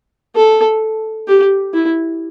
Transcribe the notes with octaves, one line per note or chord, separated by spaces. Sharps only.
A4
G4
E4